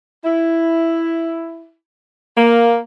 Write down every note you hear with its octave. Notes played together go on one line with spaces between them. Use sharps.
E4
A#3